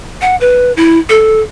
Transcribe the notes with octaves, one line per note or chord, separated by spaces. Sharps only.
F#5
B4
E4
A4